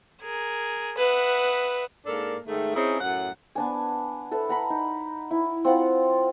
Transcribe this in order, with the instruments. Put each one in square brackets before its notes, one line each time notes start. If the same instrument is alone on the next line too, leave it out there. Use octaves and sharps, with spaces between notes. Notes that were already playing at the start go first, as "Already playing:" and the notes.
[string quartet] G#4 A#4
[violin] B4 [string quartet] E5 F#5 D#6
[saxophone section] G#2 A#3 D4 A4 A#4
G#2 D#3 A3
C4 C#4 D#4 E4 G#4
F#2 A2 F#5
[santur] B3 D4 G#5
A4 B4 E5
F#5 A#5 B5
D#4
E4
C4 F4 F#5